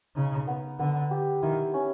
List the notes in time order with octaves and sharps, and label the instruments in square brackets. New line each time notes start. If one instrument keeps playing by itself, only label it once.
[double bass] C#3 [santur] D#4
[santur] B3
[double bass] D3 [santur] B3
[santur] G4
[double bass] D#3 [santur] E4
[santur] C#4